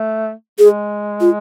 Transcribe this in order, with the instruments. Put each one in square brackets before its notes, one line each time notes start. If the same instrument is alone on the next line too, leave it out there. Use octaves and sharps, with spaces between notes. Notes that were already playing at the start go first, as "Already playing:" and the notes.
Already playing: [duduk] A3
[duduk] G#3 [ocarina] G#4
[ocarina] F4